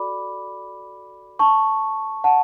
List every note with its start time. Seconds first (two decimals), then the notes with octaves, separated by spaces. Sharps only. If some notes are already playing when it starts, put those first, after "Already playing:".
Already playing: F#4 A4 D5 B5 D6
1.39 A5 C#6
2.24 F#5 A5